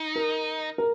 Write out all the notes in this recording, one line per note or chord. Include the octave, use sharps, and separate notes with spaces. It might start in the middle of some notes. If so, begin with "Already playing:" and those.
Already playing: D#4
A#4
A#4